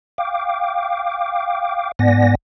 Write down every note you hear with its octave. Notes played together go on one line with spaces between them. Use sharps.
F5 G5 D6
G#2 B3 D5 F#5 G#5 A#6